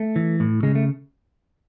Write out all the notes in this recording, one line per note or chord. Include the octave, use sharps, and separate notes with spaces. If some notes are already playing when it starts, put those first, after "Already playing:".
Already playing: A3
E3
A2
C#3 G#3
A3